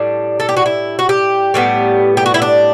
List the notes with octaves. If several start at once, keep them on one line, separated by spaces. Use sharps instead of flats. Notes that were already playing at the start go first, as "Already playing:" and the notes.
Already playing: A2 G3 D4
A4
G4
F#4
E4
F#4
G4
A2 G3 B3
G4
F#4
E4
D4